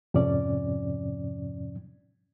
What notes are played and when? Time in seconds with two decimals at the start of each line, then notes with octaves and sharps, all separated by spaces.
0.14 F2 G#2 C3 F3 C#4 D5